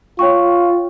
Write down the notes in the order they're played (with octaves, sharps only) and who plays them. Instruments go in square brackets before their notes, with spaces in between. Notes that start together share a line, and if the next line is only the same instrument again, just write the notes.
[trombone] F4 [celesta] C#5 G5 C#6